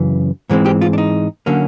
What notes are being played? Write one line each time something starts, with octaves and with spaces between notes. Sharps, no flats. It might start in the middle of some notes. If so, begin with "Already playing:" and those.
Already playing: F#2 C#3 E3
G#2 E3 G#3 C4
G4
F4
D4
D#4
D3 F#3 A#3 C#4